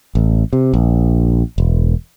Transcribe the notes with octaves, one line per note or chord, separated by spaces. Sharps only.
A1
C3
A#1
E1